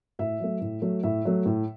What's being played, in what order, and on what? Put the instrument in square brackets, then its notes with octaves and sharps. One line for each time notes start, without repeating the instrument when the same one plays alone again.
[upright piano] A2 E5
F#3 A3
A2
F#3 A3
A2 E5
F#3 A3
A2